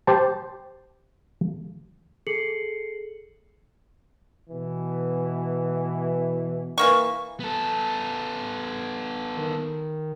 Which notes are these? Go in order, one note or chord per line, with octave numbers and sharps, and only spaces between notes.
G4 C5 A5
G#4 A4 C7 C#7 F#7
B2 E3
E3 A#3 C#6
B3 A4
D#3